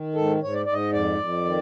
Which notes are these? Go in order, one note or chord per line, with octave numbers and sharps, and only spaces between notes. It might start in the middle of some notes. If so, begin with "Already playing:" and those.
Already playing: D#3
G#2 A4
G#2 C#5
D5
G#2 D5
D#5
F2 D5
F2
D#3